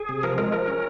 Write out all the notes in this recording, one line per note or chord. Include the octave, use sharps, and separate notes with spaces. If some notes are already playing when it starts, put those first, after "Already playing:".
Already playing: G#4
C3
F3 A#4
G#3 A#4
F3 A#4
C#4